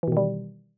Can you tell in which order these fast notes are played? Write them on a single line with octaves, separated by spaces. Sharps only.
E3 B2 D#3 G3